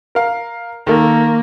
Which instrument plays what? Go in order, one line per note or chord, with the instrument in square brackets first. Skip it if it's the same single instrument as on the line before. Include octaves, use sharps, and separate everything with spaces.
[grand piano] A#4 F5
[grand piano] D#3 A4 [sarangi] A#3